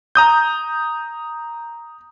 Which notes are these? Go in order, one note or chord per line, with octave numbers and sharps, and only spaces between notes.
A#5 D#6 G6